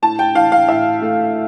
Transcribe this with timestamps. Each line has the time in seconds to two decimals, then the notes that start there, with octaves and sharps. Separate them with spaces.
0.02 A2 A5
0.19 G5
0.35 E3 F5
0.52 F5
0.68 A2 E5
1.02 A3